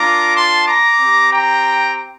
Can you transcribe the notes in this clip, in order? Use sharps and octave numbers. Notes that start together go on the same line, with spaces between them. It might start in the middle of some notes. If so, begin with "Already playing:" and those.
Already playing: A#3 D4 F4 A#5 D6
A5 C6
A#5 D6
C4 G4
G5 A#5